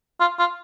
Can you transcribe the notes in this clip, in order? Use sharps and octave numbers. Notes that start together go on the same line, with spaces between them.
F4
F4